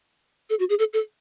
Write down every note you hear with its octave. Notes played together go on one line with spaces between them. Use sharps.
A4
F#4
G#4
A4
A4